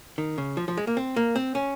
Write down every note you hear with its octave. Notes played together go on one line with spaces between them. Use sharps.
D#3
C#3
F3
F3
G#3
A#3
C4
A#3
C4
C#4